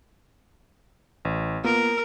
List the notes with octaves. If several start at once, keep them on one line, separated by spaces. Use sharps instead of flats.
A1
A#3 B3 F4 A#4